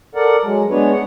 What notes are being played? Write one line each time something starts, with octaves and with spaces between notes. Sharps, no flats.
A4 A#4 D5 F#5
F#3 G#3
G#3 B3 D4 B4 C#5
F#5